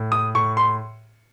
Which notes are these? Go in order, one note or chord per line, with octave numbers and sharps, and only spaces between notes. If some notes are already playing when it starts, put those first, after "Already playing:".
Already playing: A2
D#6
A2 C#6
C6